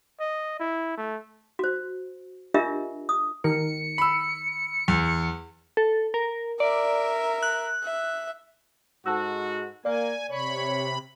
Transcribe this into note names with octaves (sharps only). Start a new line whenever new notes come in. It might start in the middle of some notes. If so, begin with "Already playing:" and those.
D#5
E4
A3
F#4 C5
D4 F4 G4 A#4 D#5 E5
D#6
D#3 A#4 C#7
B5 E6
E2
A4
A#4
A#4 D5 E5
F#6
E5
G#2 F#4 A4 A5 E6
A#3 A#4 D5 G#5
C3 C#5 B5